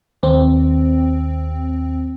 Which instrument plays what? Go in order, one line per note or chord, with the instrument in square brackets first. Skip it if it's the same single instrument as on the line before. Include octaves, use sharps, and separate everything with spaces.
[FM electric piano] D#2 C4